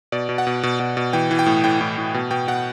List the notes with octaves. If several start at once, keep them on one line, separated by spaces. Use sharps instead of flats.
B2 D5
B2
F#5
B2
B2
B2
B2
E3 G5
E3
G5
A2
A2 G5
A2
A2
B2
B2 G5
B2 F#5